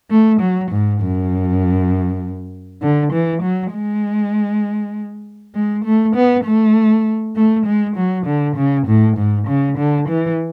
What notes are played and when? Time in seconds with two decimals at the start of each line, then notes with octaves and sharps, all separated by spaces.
0.11 A3
0.41 F#3
0.71 G#2
1.01 F#2
2.82 D3
3.13 E3
3.42 F#3
3.73 G#3
5.55 G#3
5.85 A3
6.16 B3
6.45 A3
7.36 A3
7.66 G#3
7.97 F#3
8.26 D3
8.56 C#3
8.87 A2
9.17 G#2
9.48 C#3
9.78 D3
10.09 E3